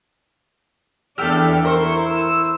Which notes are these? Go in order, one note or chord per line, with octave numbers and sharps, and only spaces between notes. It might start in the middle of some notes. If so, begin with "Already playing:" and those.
E2 D4 G4 A4 G5 E6 F6
E4 A#4 C5 C#6
E6